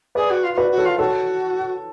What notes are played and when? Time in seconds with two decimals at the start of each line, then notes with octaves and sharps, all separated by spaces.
0.15 G#4 B4 D5
0.30 F#4
0.43 F4
0.53 F4
0.57 F#4 B4 D5
0.71 F#4
0.78 A4 C#5
0.85 F4
0.98 F#4 A4 C#5